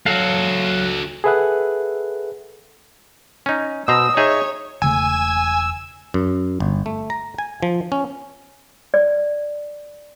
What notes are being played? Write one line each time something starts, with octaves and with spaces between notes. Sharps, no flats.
F#3 F#4 A4 F5
G#4 A4 B4 E5 F#5 F#6
C#4 D#4
B2 C5 A#5 D#6 E6
D#4 G#4 C#5 E5
E1 C#3 A3 G#5 E6
F#2
G1
A3
A#5
G#5
F3
C#4
D5